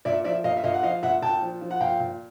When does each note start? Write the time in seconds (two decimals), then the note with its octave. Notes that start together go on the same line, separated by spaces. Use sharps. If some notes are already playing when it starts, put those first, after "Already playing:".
0.05 A#2 D5 E5
0.24 F3 D5 E5
0.44 A#2 D#5 F5
0.57 E5
0.64 A#2 D#5 F5
0.74 F#5
0.83 F3 D#5 F5
1.03 A#2 E5 F#5
1.22 A#2 G5 A5
1.41 F3
1.61 F3
1.71 F#5
1.80 A#2 F5 G5
2.00 A#2